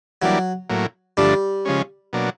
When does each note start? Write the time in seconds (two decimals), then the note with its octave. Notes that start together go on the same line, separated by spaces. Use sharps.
0.22 E3 F#3 G3 A#3 D4
0.70 A2 F#3 A#3
1.17 G2 D3 F3 G3 A3 D4
1.65 C#3 F3 G#3 C#4
2.13 B2 F#3 A#3 D4